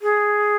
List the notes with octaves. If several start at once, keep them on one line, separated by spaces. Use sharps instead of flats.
G#4